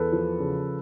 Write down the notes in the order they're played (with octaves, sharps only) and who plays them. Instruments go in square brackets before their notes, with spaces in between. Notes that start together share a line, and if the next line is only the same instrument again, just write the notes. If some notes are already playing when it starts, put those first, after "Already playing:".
Already playing: [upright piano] E2 A4 B4
F3
C#3